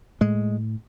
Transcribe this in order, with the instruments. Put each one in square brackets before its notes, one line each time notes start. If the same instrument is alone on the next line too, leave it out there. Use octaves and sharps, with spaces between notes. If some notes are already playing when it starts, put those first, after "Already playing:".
[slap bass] A2 G#3